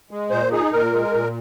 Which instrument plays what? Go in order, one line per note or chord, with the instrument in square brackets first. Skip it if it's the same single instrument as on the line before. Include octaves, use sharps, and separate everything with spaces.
[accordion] G#3
A#2 C5
D#4 G#4
A#2 A#4
G#3
A#2